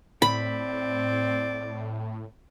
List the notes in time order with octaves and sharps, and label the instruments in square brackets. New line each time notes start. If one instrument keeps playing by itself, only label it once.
[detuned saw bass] A2 [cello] C4 [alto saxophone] D5 [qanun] B5